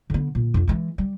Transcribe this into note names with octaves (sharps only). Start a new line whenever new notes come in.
D3 B3
A#2
F2 D3
E3 G#3
G3